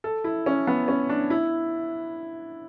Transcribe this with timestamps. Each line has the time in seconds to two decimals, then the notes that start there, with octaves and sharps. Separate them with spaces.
0.04 A4
0.24 E4
0.46 C#4
0.67 B3
0.88 C#4
1.09 D4
1.30 E4